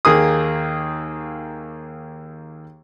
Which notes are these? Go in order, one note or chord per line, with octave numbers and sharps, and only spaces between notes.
D#2 A#3 G#4 D#6